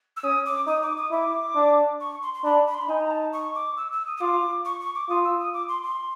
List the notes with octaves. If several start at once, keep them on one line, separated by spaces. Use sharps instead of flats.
E6
C#4 D#6
D6
D#4 D#6
D6
D#6
E4 D6
D4
C#6
C6
C6
D4 B5
B5
C6
B5
D#4 G#5
A#5
A5
C#6
D6
E6
E6
D#6
D#6
F4 D6
C#6
C#6
D6
F4 D#6
E6
D#6
D6
C6
C6